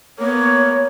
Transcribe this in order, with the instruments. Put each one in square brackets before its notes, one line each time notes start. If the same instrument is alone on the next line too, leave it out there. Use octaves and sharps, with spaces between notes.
[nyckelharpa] A#3 B3 [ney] C#5